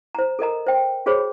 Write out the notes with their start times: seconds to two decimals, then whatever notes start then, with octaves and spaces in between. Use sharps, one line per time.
0.15 C5 A#5
0.39 A4 A#4 D#5 A#5
0.67 C5 G5
1.06 F#4 G#4 C5 C#5 B5